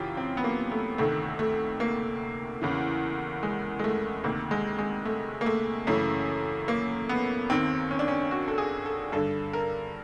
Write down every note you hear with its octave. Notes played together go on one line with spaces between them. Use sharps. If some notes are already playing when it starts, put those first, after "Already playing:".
Already playing: F#2 C#3 E3 F4 G4
C4
B3
A#3
A3
D2 C3 D#3 A3
A3
A#3
E2 C#3 E3
G#3
G#3
A3
D2 C3 D#3 A#3
G#3
G#3
A3
A#3
A3
F#2 C#3 E3 A3
A#3
B3
D#2 D#3 C4
C#4
D4
C#4
F#4
A4
G#4
A4
G2 D3 A4
A#4